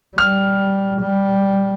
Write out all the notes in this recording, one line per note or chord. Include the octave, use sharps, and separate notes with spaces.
G3 F6
G3